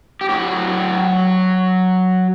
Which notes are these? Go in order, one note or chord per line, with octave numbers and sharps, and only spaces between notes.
G4
A2 F#3 F#4